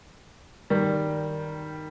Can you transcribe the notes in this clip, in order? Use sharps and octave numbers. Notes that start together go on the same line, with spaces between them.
D#3 G3